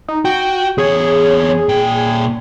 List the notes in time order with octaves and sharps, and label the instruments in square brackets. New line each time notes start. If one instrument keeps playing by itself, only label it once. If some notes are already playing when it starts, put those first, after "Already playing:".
[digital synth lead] D#4
[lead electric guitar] F#4 [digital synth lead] G5
[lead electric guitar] E2 C#5 [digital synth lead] G#4
[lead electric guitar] A#2 G5